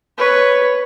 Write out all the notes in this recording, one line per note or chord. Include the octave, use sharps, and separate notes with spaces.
B4 C#5